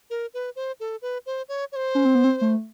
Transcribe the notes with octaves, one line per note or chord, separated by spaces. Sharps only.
A#4
B4
C5
A4
B4
C5
C#5
C#5
C5
C#4
C4
B3
C4
A3